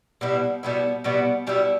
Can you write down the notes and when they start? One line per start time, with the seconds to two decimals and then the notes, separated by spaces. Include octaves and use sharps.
0.21 B2 G3 B3 E4
0.63 B2 G3 B3 E4
1.04 B2 G3 B3 E4
1.47 B2 G3 B3 E4